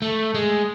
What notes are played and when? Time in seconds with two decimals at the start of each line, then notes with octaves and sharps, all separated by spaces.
0.02 A3
0.34 G#3